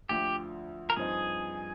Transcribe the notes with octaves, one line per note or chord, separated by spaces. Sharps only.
D2 D3 F3 G4
A#4
G2 F3 C4 D#4 G#4